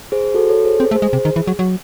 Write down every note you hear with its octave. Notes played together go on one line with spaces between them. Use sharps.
G#4 C5
F#4 A4
A4 C#5
G#4 C5
C4 G#4 C5
A3
G#4 C5
G#3
C3 G#4
D#3
E3
F#3
F#3